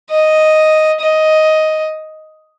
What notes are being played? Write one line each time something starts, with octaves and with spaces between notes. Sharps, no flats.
D#5
D#5